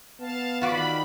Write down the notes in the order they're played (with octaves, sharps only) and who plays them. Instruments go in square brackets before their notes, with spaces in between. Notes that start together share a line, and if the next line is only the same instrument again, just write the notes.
[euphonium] B3 [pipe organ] F5 A5
[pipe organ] D#3 [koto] F4 F#4 D5 [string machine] B5